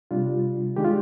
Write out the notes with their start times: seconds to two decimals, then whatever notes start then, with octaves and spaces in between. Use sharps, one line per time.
0.11 C3 G3 D4 F4
0.76 D#3 G#3 D4 G4
0.85 F4